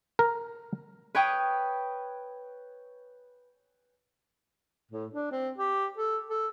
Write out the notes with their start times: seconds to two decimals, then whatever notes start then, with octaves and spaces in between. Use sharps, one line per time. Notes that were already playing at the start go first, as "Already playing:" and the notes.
0.19 A#4
1.15 B4 C#5 G5 D#6
4.91 A2
5.14 D4
5.32 C4
5.58 G4
5.97 A4
6.30 A4